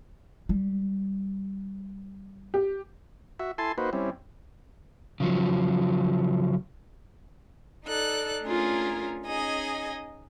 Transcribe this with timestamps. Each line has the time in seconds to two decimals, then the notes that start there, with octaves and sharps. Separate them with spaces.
0.49 G3
2.54 G4
3.39 F#4 E5
3.58 E4 A4 G#5 A5 C6
3.78 A#3 D#4 F#4 B4 C5
3.93 G3 C4 C#4 E4
5.20 C#3 F3 F#3
7.85 D#4 A4 D5 F#6
8.43 A3 C#4 D4 F4 G#4 A#4
9.25 C#4 D#4 G#4 D#5 G#5